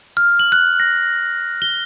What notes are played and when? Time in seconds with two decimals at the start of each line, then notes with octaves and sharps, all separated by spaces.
0.17 F6
0.39 F#7
0.52 F#6
0.80 A#6
1.62 G7